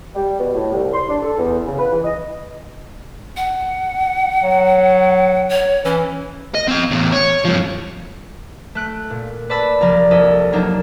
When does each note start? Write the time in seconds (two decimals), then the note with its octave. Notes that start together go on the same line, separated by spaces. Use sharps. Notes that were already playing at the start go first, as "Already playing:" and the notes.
0.15 G3
0.39 B2
0.55 A2
0.72 C2
0.94 C6
1.09 D4
1.23 A4
1.39 E2
1.67 C#3
1.79 B4
1.93 E3
2.04 D#5
3.37 F#5
4.44 F#3
5.49 C#5
5.85 E3 C#4
6.55 D#5
6.68 C4 F5
6.91 E2 A2
7.12 C#5
7.45 G2 F3
8.75 A3 F#6 D7
9.10 A#2
9.50 B4 D5 A5 B5 E6
9.81 C2 F3 A#3 A#4 D5
10.11 F2 E4 A4 D#6
10.53 F#3 A#3 D4 D#4